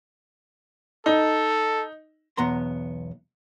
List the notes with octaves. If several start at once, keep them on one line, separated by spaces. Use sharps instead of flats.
D#4 A4
B1 E2 B3 A#5 C6